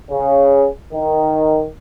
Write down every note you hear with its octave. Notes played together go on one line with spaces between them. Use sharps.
C#3
D#3